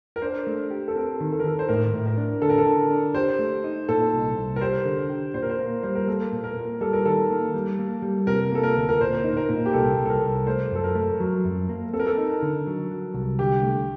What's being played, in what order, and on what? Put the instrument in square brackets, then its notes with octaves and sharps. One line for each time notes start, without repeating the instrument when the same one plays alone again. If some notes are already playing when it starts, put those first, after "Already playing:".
[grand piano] A#4
[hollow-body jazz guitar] D4 [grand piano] C5
[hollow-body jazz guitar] A3
G4
[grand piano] A4
[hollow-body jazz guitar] C4 [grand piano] A#4
[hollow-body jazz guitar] D#3
[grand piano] A4
A#4
[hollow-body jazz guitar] D#3 [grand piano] A4
[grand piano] C5
[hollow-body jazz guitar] A2 [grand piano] A#4
[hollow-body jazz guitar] A2
[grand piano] A#4
[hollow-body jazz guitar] D4
[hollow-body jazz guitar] D3 [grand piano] A4
[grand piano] A#4
A4
[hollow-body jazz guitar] D3
D4
[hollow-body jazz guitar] G4 [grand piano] C5
[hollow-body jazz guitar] A3
D#4
[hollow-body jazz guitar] A#2 [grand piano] A4
[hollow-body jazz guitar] C2
C2
[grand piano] A#4
[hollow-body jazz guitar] G4 [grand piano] C5
[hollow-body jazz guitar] D3
G4
[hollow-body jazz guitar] A#2 [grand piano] C5
[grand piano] A#4
C5
[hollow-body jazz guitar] A#3
[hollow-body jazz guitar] G3 [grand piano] C5
[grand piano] A#4
[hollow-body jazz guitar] A#3 [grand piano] A4
[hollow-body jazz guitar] A#2
[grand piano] A#4
[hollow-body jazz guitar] A#2
[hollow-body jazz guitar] G3 [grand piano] A4
[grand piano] A#4
[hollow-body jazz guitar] D#3 [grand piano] A4
[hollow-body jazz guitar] A#3
G3
A#3
G3
[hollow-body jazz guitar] C3 [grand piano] A#4
[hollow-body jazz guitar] A#3 [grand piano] A4
[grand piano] A#4
[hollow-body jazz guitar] D2
[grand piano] A#4
[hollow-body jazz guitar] A#2 [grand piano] C5
[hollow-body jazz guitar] D#4
[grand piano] A#4
[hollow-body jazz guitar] A#2
[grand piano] G4
[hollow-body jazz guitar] C2 [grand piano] A4
[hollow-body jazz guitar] C2
[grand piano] A4
A#4
[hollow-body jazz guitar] C2
[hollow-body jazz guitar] A3 [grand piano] C5
[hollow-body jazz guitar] F#2 [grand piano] A4
[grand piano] A#4
[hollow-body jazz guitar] A3
F#3
F#2
A#3
[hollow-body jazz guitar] C4 [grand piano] A4
[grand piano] A#4
A4
[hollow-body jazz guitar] D#4
D3
F#3
F#3
C2
[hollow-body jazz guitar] D3 [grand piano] G4
[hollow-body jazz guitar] A3